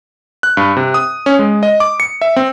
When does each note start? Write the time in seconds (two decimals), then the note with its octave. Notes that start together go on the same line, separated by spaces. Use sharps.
0.43 F#6
0.57 G2
0.77 C3
0.94 D#6
1.26 C#4
1.39 G#3
1.63 D#5
1.80 D6
2.00 C#7
2.21 E5
2.36 C4